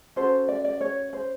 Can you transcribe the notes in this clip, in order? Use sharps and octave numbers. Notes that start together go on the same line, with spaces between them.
C#4 F#4 A4 C5
D5
D5
C#5
C5